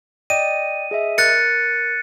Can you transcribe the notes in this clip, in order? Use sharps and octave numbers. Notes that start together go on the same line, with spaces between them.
D5 D#5 G5 D#7
G#4 D#5 E5
A#4 F#6 A6 C#7